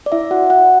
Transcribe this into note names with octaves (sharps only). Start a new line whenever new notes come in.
D5
E4 E5
F#4 F#5
F#4 F#5